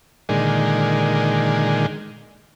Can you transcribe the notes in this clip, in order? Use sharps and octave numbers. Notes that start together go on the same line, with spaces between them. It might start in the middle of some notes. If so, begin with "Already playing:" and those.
A#2 D3 D#3 G#3